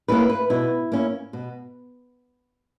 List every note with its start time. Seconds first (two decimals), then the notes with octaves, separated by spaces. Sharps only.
0.08 A#3 C#4 E4 B4
0.29 B4
0.50 B2 E4
0.92 A#3 C#4 E4
1.33 B2